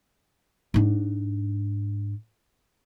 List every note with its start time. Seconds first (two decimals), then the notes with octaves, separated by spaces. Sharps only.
0.74 G#2 D4